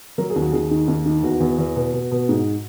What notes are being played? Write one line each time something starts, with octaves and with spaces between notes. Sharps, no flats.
F#3 A#4
G#4
D#2
F#4
D#2 G#4
D#3
D#2
D#3
E2 F#4
E2
E2
B2
B2
B2
G#2